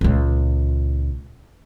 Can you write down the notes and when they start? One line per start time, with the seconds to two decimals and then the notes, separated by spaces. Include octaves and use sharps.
0.01 C#2 A#2